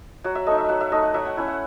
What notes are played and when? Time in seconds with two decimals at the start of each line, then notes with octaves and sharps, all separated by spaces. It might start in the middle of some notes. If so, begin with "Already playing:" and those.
0.24 F#3 F#5
0.35 E5
0.47 A3 D#4 D#5
0.58 E5
0.69 F#3 F#5
0.81 E5
0.92 A3 D#4 D#5
1.03 F#5
1.14 F#3 E5
1.25 F#5
1.37 C#4 E4
1.48 F#5